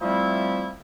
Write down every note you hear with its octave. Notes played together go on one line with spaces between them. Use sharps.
F3 G3 A3 C4 E4